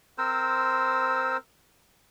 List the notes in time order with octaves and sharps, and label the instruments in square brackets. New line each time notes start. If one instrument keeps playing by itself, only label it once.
[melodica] C4 A#4 C5 E6